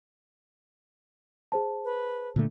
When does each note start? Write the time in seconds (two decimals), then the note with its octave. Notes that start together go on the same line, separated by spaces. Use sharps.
1.52 G#4 C5 A5
1.84 B4
2.36 A#2 D3 A3